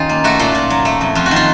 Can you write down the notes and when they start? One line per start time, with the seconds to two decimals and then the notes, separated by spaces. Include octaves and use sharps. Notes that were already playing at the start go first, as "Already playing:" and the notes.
Already playing: D#3 C#4 F4
0.09 A#3
0.24 A3 F#4
0.39 A#2 F4
0.55 A#2
0.70 F#3
0.85 A3
1.01 F2
1.15 F2 F4
1.26 F#4
1.31 D#3
1.36 F4